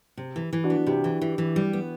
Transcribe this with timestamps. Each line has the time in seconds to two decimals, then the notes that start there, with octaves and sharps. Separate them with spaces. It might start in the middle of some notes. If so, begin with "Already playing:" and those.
0.17 C3
0.36 E3
0.53 E3
0.64 D4 F#4
0.70 B3
0.87 C3 E4 G4
1.04 E3
1.21 E3
1.38 E3
1.56 G3
1.73 B3